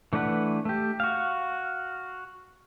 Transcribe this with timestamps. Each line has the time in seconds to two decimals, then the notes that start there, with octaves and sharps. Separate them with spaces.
0.13 E3 A3 D4 B4 F#5
0.65 A3 G4
1.00 F#4 F5